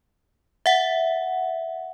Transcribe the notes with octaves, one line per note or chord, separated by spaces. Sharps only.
E5 F#5